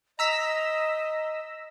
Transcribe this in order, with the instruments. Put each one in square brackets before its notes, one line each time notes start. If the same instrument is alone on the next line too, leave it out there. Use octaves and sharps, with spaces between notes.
[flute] D#5 [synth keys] A#5 E6 B6